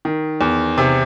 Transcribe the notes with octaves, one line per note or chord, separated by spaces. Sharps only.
D#3
E2
C3